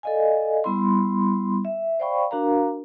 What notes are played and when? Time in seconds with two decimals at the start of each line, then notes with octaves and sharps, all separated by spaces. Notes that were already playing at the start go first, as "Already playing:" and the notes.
0.03 A4 D5 D#5 F5 G#5
0.64 G3 B3 E4 B5 C6
1.65 E5
1.99 C5 D5 F5 G5 B5 C#6
2.31 D4 F#4 A#4 F5 A#5